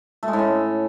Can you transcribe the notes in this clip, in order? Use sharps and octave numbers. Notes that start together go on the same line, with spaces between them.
A3
G#3
A2
C#4